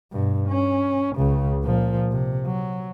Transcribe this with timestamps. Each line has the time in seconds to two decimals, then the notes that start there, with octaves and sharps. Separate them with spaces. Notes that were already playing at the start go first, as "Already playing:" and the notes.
0.13 G2 B2
0.49 C#4
1.16 C#2 C#3
1.63 A#2 F3
2.12 C3
2.46 F#3